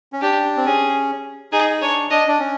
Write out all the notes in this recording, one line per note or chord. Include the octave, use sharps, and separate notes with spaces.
C#4
D4 G4
C4
C#4 G#4
D#4 G#4
D4 C#5
D4 D#5
D4
C#4